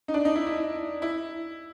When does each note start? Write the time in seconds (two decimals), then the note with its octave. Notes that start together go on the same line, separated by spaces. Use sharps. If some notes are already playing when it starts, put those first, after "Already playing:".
0.08 D#4
0.14 D4
0.25 D#4
0.35 E4
0.47 E4
1.02 E4